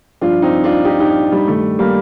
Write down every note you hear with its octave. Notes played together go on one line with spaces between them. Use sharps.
G2 F3 D4 F4
C4 D#4
D4 F4
D#4 G4
D#4 G4
G3
G2 D#3 G3 A3
G3 A#3